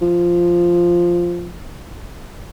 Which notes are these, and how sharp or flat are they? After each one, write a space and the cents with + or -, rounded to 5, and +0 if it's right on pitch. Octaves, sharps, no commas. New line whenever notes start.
F3 -5